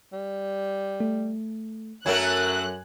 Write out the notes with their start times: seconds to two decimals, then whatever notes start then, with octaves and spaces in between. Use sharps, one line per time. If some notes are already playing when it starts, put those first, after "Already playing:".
0.13 G3
1.00 A3
2.06 F#2 F#3 A3 A#4 G#5 F#6